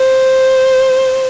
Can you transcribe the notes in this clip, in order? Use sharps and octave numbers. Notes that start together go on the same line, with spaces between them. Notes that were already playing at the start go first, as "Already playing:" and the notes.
Already playing: C5